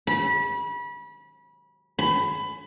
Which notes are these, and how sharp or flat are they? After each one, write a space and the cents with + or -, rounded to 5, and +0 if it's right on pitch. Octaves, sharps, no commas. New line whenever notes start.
B5 -30
B5 +20